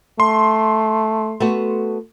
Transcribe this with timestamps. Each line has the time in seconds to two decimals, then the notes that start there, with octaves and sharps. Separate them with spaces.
0.20 A3 C6
1.40 A3 B3 F#4